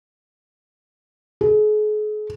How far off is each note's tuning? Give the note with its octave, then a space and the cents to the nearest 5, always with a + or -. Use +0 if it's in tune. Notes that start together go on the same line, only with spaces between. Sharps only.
G#4 +40